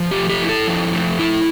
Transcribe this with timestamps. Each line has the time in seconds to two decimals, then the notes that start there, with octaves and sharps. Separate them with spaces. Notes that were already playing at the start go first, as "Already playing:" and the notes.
Already playing: F3
0.11 G4
0.17 A3
0.29 G4
0.42 E4
0.49 A4
0.67 F3
0.93 A3
1.19 E4